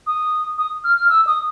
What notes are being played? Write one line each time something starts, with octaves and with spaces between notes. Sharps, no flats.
D#6
D#6
F6
F6
E6
D#6